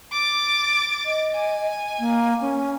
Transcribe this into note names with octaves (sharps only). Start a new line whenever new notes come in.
D6 A6
D#5
G#5
A#3
C#4